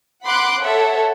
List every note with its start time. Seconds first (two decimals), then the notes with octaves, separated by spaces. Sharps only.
0.23 F#5 B5 C6 D6 F#6
0.62 A4 C#5 E5 F#5